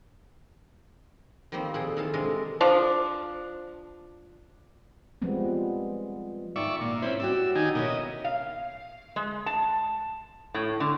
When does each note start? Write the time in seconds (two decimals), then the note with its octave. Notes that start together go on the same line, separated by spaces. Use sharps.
1.52 D#3 F3 G3 A#3 C4
1.74 A#2 G#4 A4 G5
1.97 D#3 E3 A4 F5 A5
2.14 C3 G#3 D4 A4 A#4 D#5
2.61 F3 D4
5.22 F3 G3 G#3 B3 C4
6.56 G#2 D#3 F4 D5 E5 C#6
6.81 A#2
7.02 C4 C#4 E4 D5
7.20 F#4 G4 D5 E6
7.55 D#3 D#4 G#5
7.75 B2 C#4 E4 A#4 D#5
8.24 F5
9.16 G#3
9.46 A5
10.54 A2
10.80 D3